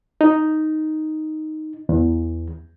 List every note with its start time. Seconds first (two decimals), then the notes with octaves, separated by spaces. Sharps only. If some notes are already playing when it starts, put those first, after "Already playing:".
0.21 D#4
1.89 E2